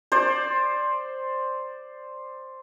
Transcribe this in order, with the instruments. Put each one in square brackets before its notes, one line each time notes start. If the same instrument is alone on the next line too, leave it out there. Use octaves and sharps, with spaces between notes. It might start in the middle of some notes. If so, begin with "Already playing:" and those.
[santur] C5 D5